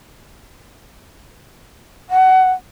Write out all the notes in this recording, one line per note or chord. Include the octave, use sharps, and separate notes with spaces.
F#5